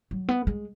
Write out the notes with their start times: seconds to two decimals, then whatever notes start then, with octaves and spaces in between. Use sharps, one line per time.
0.11 F#3
0.29 B3
0.47 G#3